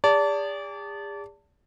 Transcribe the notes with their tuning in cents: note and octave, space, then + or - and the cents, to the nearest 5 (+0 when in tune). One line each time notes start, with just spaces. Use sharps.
G#4 -40 D5 -30 A5 +20